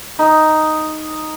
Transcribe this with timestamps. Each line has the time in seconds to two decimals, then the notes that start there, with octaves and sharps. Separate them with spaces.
0.19 D#4